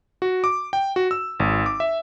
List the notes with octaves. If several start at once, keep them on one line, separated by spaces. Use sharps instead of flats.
F#4
D6
G5
F#4
E6
G#1
D6
E5